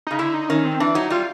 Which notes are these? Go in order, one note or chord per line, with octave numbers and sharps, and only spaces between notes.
C#3 D#4
D3 E4
D#4
D#3 C#4
C4
E3 D4
F#3 D#4
G3 F4